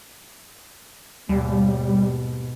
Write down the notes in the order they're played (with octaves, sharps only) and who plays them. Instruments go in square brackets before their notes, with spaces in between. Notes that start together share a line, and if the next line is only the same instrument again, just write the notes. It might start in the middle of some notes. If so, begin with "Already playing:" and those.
[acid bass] D#2 [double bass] G#2 B2 [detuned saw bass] G3